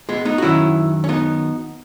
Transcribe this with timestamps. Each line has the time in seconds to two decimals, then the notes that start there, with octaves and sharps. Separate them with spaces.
0.09 G#3 B3
0.25 B3 D#4
0.38 F#4
0.42 F#2 D#3 F#3 C#4 E4
1.04 C#4
1.09 B3 D#4